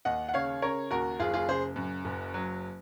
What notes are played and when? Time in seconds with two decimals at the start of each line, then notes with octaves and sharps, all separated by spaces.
0.05 D#2 D#5 F#5
0.28 F#5
0.34 C#3 C#5 F5
0.62 C#3 A#4 C#5
0.91 D#2 F#4 A#4
1.19 F#1 F4 G#4
1.34 F4 G#4
1.48 C#3 G#4 C5
1.76 F#2
2.05 F#1
2.34 F#3